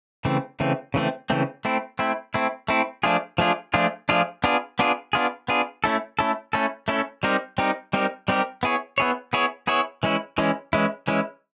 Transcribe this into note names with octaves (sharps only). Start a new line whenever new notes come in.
C#3 E3 A3 C4
C#3 E3 A3 C4
C#3 E3 A3 C4
C#3 E3 A3 C4
A3 C4 E4
A3 C4 E4
A3 C4 E4
A3 C4 E4
F3 A3 D4 F4 G#4
F3 A3 D4 F4 G#4
F3 A3 D4 F4 G#4
F3 A3 D4 F4 G#4
B3 D4 F4 G#4
B3 D4 F4 G#4
B3 D4 F4 G#4
B3 D4 F4 G#4
A3 C#4 E4 A4
A3 C#4 E4 A4
A3 C#4 E4 A4
A3 C#4 E4 A4
G3 C4 D#4 G4 A#4
G3 C4 D#4 G4 A#4
G3 C4 D#4 G4 A#4
G3 C4 D#4 G4 A#4
B3 E4 G#4 C#5
B3 E4 G#4 C#5
B3 E4 G#4 C#5
B3 E4 G#4 C#5
E3 G#3 C#4 E4
E3 G#3 C#4 E4
E3 G#3 C#4 E4
E3 G#3 C#4 E4